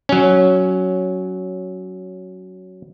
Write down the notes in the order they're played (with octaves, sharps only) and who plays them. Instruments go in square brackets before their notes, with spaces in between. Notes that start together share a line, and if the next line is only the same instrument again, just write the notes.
[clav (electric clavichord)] F#3 C#4